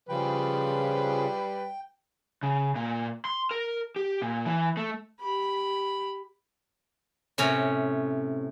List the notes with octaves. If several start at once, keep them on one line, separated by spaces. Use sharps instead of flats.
C#3 F3 G3 B4 G5
C#3
A#2
C6
A#4
G4
A#2
E3
A3
G4 B5
A2 C3 C#4 A#5